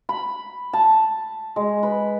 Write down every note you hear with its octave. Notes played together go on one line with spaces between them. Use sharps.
B5
A5
G#3
B4